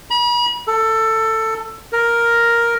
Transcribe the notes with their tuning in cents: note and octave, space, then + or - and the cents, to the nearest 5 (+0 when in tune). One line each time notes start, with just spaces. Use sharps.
B5 -40
A4 +15
A#4 +5